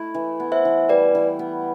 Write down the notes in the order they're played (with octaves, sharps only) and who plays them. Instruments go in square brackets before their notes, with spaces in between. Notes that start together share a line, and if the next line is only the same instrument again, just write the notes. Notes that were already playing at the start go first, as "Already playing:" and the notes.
Already playing: [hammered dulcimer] A3 E4
E3
B3
[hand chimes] C5 E5
[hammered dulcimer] E3
[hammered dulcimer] G3 [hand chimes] B4 D5
[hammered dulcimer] E3
B3